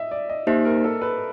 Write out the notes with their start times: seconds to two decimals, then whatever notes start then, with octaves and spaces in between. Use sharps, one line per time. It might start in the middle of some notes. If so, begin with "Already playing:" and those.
Already playing: D#5 E5
0.11 D5
0.29 D#5
0.47 A#3 D#4 G4 C5 E5
0.65 A#4
0.84 A4
1.01 B4